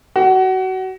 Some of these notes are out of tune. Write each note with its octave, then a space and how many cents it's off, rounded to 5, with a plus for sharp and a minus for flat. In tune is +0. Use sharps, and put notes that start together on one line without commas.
F#4 +25